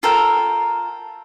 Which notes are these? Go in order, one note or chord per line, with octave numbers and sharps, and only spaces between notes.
F4 A4 A#4 G5